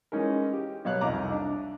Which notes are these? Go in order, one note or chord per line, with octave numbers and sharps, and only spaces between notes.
E3 G#3 C#4 D#4 A#4
G4
B2 F#3 C#5 F5 F#6
C2 F2 D#4 D#5 A#5 D6
D4